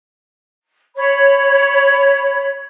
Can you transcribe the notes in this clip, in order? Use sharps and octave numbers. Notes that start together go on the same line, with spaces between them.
C#5 B5